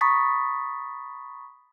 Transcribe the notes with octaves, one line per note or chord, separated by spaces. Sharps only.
A#5 B5 C#6 D#6 A6 B6